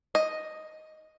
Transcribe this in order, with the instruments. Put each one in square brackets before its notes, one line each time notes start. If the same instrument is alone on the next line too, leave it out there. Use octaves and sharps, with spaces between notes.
[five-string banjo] D#5